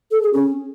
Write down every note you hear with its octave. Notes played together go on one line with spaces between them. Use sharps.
A4
G#4
C#4